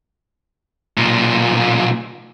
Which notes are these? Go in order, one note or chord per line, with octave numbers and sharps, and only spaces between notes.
B1 A#2